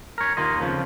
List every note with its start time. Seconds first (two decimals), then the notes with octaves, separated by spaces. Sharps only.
0.18 A#4 C#5
0.37 D#2 A#3 F4 D#5
0.61 F2 C#3 F3